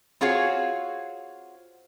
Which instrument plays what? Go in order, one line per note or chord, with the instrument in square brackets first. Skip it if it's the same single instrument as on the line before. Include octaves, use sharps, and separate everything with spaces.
[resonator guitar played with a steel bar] C4 F4 F#4 G#4 C#5